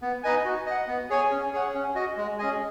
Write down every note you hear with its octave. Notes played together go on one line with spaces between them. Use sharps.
B3
D#4 B4 D#5 G#5
F#4
D#5 F#5
B3
G#4 C#5 G#5
C#4
G#4 C#5 F#5
C#4
F#4 D#5
G#3
C#4 G#4 D#5 G#5